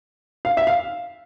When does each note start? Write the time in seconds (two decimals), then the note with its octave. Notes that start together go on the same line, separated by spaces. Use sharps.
0.45 F5
0.57 E5
0.67 F5